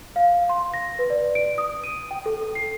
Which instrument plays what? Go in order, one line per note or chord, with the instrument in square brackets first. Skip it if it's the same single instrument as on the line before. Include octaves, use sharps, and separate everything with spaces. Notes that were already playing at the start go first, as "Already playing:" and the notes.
[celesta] F5
C6
A#6
B4
D5
D7
D#6
D#7
G5
A4
C7